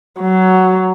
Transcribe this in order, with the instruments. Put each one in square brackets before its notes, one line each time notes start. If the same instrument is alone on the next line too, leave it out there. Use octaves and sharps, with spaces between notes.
[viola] F#3